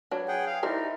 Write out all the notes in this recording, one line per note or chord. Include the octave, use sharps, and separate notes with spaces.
F#3 D4 B4 C#5
G#4 F#5 G5
F5
D#4 E4 A#4 C5 D5 E5